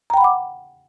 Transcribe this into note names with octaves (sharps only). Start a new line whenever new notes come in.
F#5 G5 A#5 B5 D6